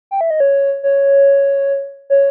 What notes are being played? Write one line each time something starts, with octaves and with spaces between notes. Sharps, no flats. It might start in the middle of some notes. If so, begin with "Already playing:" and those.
G5
E5
D#5
C#5
C#5
C#5